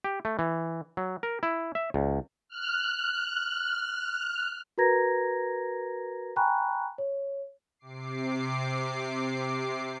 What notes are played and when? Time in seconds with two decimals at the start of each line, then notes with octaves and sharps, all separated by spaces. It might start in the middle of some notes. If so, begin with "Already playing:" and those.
0.04 G4
0.25 A3
0.39 E3
0.97 F#3
1.23 A#4
1.43 E4
1.75 E5
1.94 C#2
2.49 F6 F#6
4.78 F#4 A#4 B4 A#5 G#6 A#6
6.36 G5 G#5 A#5 B5 C#6 F#6
6.98 C#5
7.79 C3 D6 C7